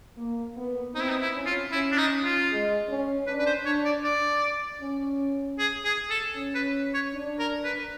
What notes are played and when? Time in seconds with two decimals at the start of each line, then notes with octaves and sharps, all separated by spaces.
0.18 A#3
0.57 B3
0.95 C4 D#4
1.03 E4
1.10 D#4
1.21 E4
1.34 C#4
1.46 F4
1.72 C#4 E4
1.92 D4
1.98 D#4
2.24 F4
2.50 G#3
2.88 C#4
3.27 D4 B4
3.39 B4
3.47 C5
3.66 D4 C#5
3.85 D5
4.04 D5
4.81 C#4
5.59 G#4
5.85 G#4
6.11 A4
6.36 C#4
6.55 B4
6.94 C#5
7.14 D4
7.39 A#4
7.65 B4